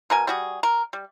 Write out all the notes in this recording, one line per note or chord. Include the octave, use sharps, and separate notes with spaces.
B2 A#4 G#5
G3 F#4 G#4
A#4
G3